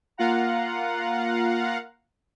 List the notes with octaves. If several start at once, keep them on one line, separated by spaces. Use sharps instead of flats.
A#3 F4 F5 F#5 A#5